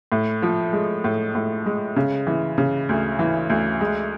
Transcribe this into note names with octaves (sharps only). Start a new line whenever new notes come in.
A2
F3
G#3
A2
A2
G#3
C#3
E3
C#3
D2
E3
D2
G#3